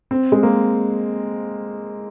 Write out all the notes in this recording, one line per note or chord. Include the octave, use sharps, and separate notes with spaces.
C4
G#3
A#3